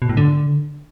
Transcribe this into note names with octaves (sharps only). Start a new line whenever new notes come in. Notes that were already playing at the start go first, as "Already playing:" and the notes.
B2
A2
D3